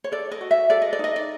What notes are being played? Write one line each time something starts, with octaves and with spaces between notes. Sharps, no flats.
C#5
A4 D5
D#5
F#4
E5
A4 D5
D#5
D5
D#4 D#5
D5